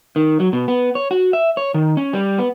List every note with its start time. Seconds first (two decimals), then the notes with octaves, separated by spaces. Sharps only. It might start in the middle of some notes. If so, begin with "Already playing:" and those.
0.16 D#3
0.40 F#3
0.53 B2
0.68 B3
0.95 C#5
1.11 F#4
1.33 E5
1.57 C#5
1.74 D#3
1.97 C#4
2.13 G3
2.38 B3